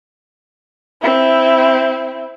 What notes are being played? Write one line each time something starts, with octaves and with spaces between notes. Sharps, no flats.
C4 E4